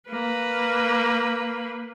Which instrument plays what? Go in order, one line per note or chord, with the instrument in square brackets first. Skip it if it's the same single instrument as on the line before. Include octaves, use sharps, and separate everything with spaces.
[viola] A#3 B4